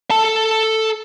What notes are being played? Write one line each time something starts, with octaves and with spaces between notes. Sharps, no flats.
A4 A5